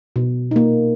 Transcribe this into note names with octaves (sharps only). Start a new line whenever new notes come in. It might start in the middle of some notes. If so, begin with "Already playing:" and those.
B2
A#3 D#4